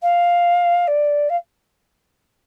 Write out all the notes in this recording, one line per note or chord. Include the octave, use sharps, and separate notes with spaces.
F5
D5
F5